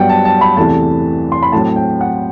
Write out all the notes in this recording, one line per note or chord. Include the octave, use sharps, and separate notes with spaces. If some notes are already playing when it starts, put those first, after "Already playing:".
Already playing: G2 F#3 B3 F#5 G5
A5
A5
B5
E2 C3 E3 A3 A5
C6
B5
A2 F#3 C4 A5
G5
F#5